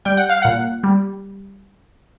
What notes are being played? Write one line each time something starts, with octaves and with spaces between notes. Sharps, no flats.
G3 G5
F#5
F5
A#2 F#5
G3